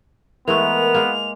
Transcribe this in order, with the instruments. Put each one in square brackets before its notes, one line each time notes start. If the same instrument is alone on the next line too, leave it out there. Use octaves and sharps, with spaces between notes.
[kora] E3 G#3 A3 [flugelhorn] B3 [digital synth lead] A#4 [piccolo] F7
[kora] G#3 A#3